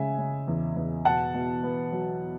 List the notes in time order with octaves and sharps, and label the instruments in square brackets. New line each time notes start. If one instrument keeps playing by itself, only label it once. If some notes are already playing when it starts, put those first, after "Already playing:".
Already playing: [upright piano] C#3 G#3 E5 G#5
C#3
E2
E2
B2 F#5 A5
B2
B3
F#3